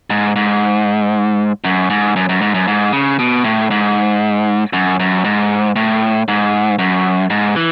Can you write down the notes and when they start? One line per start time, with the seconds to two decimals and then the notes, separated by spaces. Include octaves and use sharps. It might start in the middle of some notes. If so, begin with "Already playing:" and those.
0.10 G#2
0.36 G#2
1.64 F#2
1.90 G#2
2.16 F#2
2.29 F#2
2.41 G#2
2.54 F#2
2.68 G#2
2.93 C#3
3.19 B2
3.44 A2
3.71 G#2
4.73 F#2
5.00 F#2
5.25 G#2
5.76 A2
6.28 G#2
6.79 F#2
7.30 G#2
7.56 E3